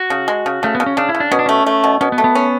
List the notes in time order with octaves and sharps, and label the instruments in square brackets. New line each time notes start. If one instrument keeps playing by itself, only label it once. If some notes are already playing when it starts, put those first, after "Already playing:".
Already playing: [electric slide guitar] F#4
[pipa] C#3
G#3
C#3
[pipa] C#3 [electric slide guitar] A3
[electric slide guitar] B3
[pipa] C#3
[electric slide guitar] C#4
[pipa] C#3 [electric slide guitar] D4
[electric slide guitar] E4
[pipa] C#3
[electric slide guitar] D4
[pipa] B2 [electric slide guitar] C#4
[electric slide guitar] D4
[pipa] A3 [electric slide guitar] C#4
[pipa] A3
B2
[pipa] B2 [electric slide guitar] C#4
[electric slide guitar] B3
[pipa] A3
[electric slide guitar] B3
[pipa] C#4